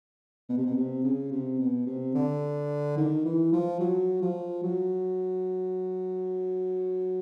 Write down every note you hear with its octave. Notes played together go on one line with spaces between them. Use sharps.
B2
C3
B2
C3
C#3
C3
B2
C3
D3
D#3
E3
F3
F#3
F3
F#3